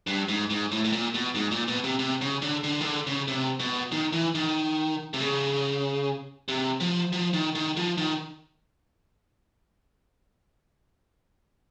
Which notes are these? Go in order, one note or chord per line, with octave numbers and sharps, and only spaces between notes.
G2
G#2
G#2
A2
A2
A#2
B2
G#2
A#2
B2
C3
C3
C#3
D3
D3
D#3
D3
C#3
C3
B2
D#3
E3
D#3
C3
C#3
C3
F3
F3
D#3
D#3
F3
D#3